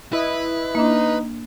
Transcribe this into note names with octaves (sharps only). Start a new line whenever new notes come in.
E4 B4 D#5
A#3 D4 D#4